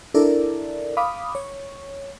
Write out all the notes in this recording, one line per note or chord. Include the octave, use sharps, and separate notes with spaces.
D4 E4 A4 A#4 D5
F5 B5 D6 D#6
C#5